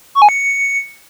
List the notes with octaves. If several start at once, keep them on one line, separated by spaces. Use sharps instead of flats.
C#6
G#5
C#7